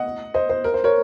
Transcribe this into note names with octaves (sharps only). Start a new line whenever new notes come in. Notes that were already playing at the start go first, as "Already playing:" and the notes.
Already playing: D#5 F#5
C5 D#5
C5
A#4
C5
A#4 C#5